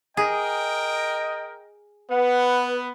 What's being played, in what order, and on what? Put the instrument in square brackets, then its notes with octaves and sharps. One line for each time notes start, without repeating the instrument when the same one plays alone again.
[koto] G#4 [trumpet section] A#4 G5 [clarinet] D#5
[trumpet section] B3 [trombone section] B4 [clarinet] F#5